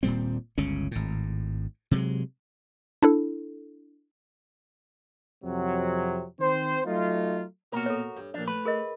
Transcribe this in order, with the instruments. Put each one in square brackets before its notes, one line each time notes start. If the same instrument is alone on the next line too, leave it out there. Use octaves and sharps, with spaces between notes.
[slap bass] D#1 A#2 G3 C4
G1 C#2 C#3 C#4
G#1 A2
C3 F#3 G#3
[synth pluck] D4 E4 A4
[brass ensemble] F2 C3 F#3
D#3 C4 C5
F#3 A3 D#4 F4
[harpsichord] B1 A#2 [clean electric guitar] F#4 A#4
[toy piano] A4 C#5
[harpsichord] G2
[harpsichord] A#2 F3 [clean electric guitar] D4
[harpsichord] A3 [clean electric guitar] B4
[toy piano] G#4 A#4 D#5